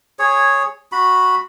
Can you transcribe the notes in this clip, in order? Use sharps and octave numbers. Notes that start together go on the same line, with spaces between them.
G#4 C#5
F#4 B5